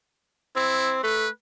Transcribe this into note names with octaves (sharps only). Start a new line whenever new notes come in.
C4 E4
A3 B4